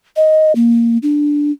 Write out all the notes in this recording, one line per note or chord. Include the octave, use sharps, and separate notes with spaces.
D#5
A#3
D4